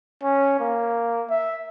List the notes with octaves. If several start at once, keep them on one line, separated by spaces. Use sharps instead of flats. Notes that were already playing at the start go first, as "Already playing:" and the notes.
C#4
A#3
E5